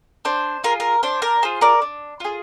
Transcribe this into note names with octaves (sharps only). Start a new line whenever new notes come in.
D4 C5
F4 G#4 A#4
A#4
D4 C5
A#4
F4 G#4 C5
A#4 D5
D4
F4 G#4